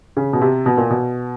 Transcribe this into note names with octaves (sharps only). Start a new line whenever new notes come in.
C#3
B2
C3
B2
A#2
B2